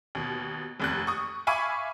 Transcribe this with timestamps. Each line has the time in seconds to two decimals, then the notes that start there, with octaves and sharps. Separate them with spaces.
0.15 D#2 B2
0.80 F1 D#2 F#6
1.07 C#6 D#6
1.47 E5 F5 G#5 B5 C#6 D6